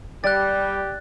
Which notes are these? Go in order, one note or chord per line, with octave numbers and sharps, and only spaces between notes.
G3 G4 D5 F#6 A6